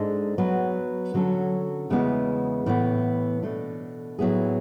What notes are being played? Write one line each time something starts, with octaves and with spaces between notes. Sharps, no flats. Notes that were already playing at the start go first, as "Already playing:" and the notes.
Already playing: G#2 G#3 D4 A4
F#3 B3 F#4 B4
D3 F#3 C#4 F#4 A4
E2 C#3 G#3 B3 E4
A2 E3 B3
B2 A3 D4
A2 F#3 B3 E4 G#4